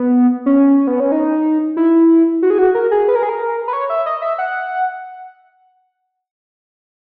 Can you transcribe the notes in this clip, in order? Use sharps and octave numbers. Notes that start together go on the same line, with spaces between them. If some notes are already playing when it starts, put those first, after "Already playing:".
Already playing: B3
C#4
B3
C#4
D#4
E4
F#4
G#4
F#4
A#4
G#4
B4
A#4
G#4
A#4
B4
C#5
E5
D#5
E5
F#5